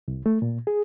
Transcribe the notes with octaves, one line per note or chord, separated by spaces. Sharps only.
C2
A3
A#2
G#4